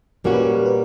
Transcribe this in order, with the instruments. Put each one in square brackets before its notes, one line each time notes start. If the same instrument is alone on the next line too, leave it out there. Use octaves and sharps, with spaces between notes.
[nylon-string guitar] A#2 G3 A#3 C#4 F#4 [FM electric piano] A#4
[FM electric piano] B4
A#4
A#4
B4